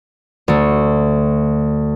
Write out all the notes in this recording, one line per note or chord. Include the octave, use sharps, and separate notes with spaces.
D2 A3